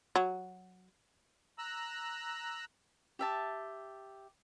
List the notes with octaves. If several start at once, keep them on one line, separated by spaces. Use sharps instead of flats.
F#3
A#5 E6 F#6
G4 E5 A5